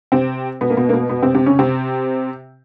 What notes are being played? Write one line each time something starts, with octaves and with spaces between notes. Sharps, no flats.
C3 C4
B2 B3
A#3
B2 B3
A#3
B2 B3
B2 B3
C3 C4
C3 C4
C#3 C#4
C3 C4